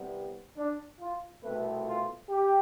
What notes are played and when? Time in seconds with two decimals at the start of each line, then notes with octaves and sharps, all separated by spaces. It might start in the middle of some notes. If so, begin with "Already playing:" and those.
Already playing: C2 C3 G3 B3
0.57 D4
1.01 F4
1.43 C2 B2 A3 C4 B4
1.87 F4
2.29 G4